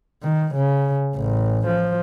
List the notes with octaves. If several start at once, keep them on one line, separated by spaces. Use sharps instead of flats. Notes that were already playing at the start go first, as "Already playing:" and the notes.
D#3
C#3
A1
F3